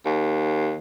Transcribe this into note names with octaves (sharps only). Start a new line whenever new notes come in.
D#2